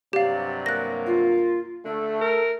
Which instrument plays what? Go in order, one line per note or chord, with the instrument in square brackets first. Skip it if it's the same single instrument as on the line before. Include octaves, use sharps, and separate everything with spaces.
[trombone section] G2 C3 F#3 [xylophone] G4 F5 [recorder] D5
[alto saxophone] A#3 [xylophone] F#6 A#6
[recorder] F4
[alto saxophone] D3 [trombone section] A3 [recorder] A4
[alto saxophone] A#4